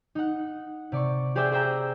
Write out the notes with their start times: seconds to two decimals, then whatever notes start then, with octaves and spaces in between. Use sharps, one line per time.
0.15 D#4 F#5
0.92 C3 D5 C#6
1.35 G4 G#4 C5 D5 E5 G5
1.52 G#4 C5 E5 G5 A#5 E6